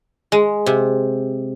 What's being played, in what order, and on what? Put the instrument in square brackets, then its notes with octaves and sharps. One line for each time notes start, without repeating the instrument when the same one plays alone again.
[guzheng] G#3
C3